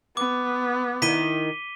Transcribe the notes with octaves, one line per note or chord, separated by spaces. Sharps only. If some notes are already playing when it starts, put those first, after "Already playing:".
B3 D6
D#3 E4 B6 D#7 G7